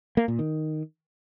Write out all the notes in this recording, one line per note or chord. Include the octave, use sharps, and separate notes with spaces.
A#3
A#2
D#3